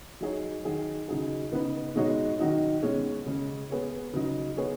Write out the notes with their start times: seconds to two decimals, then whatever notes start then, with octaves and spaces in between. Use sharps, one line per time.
0.21 F#3 D#4 G#4 C#5
0.65 D#3 F#3 D#4 G#4
1.08 C#3 F#3 D#4 G#4
1.52 C#3 B3 D#4 B4
1.96 B2 G#3 D#4 F#4 C#5
2.39 D#3 F#3 D#4 F#4
2.83 B2 G#3 C#4 G#4 C#5
3.27 C#3 G#3 C#4
3.70 B3 G#4 C#5
4.13 C#3 F#3 D#4
4.57 B3 G#4 C#5